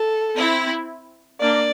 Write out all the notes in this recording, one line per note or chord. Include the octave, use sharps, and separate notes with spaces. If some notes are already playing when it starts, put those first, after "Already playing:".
Already playing: A4
C4 E4
A#3 D4 D5